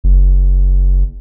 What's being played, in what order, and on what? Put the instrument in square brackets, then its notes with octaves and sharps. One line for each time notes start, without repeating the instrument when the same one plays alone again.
[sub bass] F#1